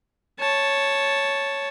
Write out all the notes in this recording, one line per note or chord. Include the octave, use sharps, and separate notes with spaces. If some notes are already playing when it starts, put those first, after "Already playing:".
C#5 A5